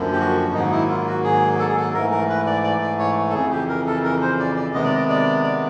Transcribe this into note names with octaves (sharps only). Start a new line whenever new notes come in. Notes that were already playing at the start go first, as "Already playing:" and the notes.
Already playing: F#2 D3 F3 A#3
G4
F#4
G#2 D#3 F#3 A#3 D#4
E4
F4
F#4
G#4
A4
G#4
A4
G#2 E3 A3 A#4
A#4
B4
D5
D5
D5
C#5
A4
F2 C#3 E3 G#4
G4
A#4
A4
A#4
C5
D5
D5
C3 D#3 G#3 B3 D#5
D5
D#5
D5
D5